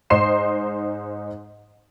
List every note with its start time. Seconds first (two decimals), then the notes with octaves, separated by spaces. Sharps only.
0.10 G#2 D#4 C5 C6 C7 E7